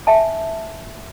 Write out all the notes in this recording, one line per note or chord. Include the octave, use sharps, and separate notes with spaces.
E5 G#5 A5